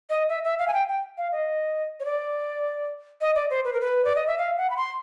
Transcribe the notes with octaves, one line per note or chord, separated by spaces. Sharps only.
D#5
E5
E5
F5
G#5
G5
G5
F5
D#5
C#5
D5
D#5
D5
C5
B4
A#4
B4
D5
D#5
E5
F5
F#5
B5
C6